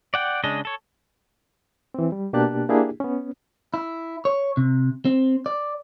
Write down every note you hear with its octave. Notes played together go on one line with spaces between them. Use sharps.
D5 F#5 G5
C#3 G#3 D4 D#5
A4 C#5
E3 C4
G3
B2 A#3 D4 G4 A5 F#6
A#3 D4 E4 G4 G#4
B3 C#4
E4
C#5
C3
C4
D5